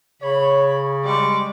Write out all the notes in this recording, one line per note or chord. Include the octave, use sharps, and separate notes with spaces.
C#3 C#5 B5
G3 G#3 D5 C#6